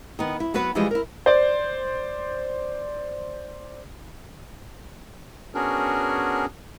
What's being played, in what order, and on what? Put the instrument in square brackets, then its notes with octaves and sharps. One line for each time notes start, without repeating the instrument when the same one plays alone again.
[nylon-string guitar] D#3 B3
E4
F#3 B3 F#4 B4
E3 F3 G3 G#3 E4 D#5
E4 A#4
[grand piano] C5 D5
[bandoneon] B3 C#4 D4 F#4 G#4 A#4